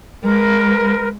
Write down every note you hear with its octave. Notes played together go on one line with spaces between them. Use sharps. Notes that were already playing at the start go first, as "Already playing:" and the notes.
G#3 A#4 B4